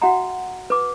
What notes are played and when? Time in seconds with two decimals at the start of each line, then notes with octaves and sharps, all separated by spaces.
0.02 F#4 E5 F#5 G5 A#5
0.70 B4 D6